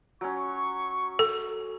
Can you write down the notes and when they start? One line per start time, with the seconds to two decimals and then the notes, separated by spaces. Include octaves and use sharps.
0.21 F#3 C#4 C#6
1.19 A4